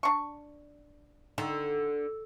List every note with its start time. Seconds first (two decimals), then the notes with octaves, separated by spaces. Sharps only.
0.03 D4 C#6
1.38 D3 D#3